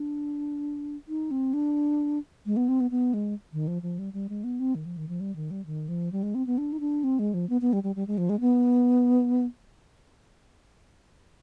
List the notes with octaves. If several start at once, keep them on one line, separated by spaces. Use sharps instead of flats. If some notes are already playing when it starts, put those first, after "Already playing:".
Already playing: D4
D#4
C4
D4
G#3
B3
C4
B3
B3
G#3
D#3
F3
F3
G3
G3
G#3
B3
C4
D#3
F3
D#3
F3
G3
D#3
G3
D#3
F3
G3
G#3
C4
B3
D4
D#4
D4
C4
G#3
F3
B3
B3
G3
G3
G3
G#3
F3
G#3
B3